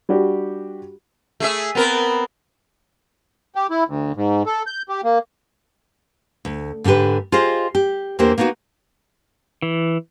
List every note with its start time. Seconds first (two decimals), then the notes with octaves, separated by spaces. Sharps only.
0.09 G3 D4 F#4 G4
1.40 A3 G#4 E5
1.75 B3 C4 A#4
3.55 G4
3.70 E4
3.87 D2
4.16 G#2
4.46 A4
4.67 G6
4.89 G4
5.04 A#3
6.45 D2
6.84 G#2 D3 D4 G4 B4
7.32 F4 G4 G#4 C5 D#5 F5
7.75 G4
8.19 E2 E3 A#3 D4 G4 C5
8.38 A#3 B3 D#4 F4 F#4
9.62 E3